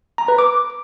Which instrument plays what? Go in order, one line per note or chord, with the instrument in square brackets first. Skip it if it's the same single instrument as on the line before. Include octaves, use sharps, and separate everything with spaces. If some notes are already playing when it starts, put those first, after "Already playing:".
[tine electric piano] A#5
B4
D6